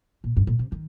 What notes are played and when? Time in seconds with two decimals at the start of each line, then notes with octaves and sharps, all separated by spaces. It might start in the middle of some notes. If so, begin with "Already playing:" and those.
0.24 A#2
0.37 G2
0.47 A#2
0.59 C3
0.72 D#3